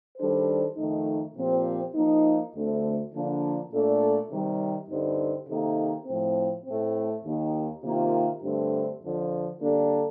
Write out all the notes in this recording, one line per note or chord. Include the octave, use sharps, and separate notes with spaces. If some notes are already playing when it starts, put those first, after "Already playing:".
D#3 G3 D4 A4 C5
F2 D#3 A3 D#4
A#2 F3 C4 G4
F3 A#3 D#4
D2 D3 A3 C4
D3 F3 A#3 D4
A#2 A3 D4 A4 D5
C3 D#3 G3
G2 D3 G3 C4 D#4
C3 D#3 A#3 D#4 A4
A2 F3 C4
A2 A3 C4
D#2 D#3 A#3 D#4 G4
C3 D#3 A#3 F4
G2 D3 A3 C4 G4
F2 D3 F3
D3 G3 A#3 D4 A4